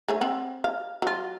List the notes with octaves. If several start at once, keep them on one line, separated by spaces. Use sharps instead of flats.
A3 G#4 C#5
C4 F#5
F5
F#3 F4